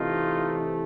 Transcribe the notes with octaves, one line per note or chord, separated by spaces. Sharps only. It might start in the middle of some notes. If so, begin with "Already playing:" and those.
Already playing: C3 E3 A3 D#4 F4